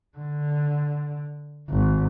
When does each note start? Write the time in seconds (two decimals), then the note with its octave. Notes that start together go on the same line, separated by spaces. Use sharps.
0.18 D3
1.70 G#1